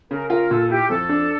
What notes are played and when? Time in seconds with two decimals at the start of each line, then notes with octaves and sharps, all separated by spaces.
0.11 C#3 A#4
0.30 F4 A#4
0.51 A#2 A4
0.70 E4 G4
0.90 F2 A4
1.09 D4